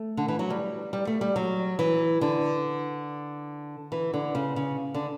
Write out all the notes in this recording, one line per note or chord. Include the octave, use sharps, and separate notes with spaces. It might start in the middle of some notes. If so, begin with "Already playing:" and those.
Already playing: A3
D3
E3
F#3
G3
G3
A3
G3
F#3
E3
D3
E3
D3
C#3
C#3
D3